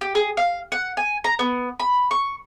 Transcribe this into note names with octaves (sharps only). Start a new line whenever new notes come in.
G4
G#4
F5
F#5
G#5
A#5
B3
B5
C#6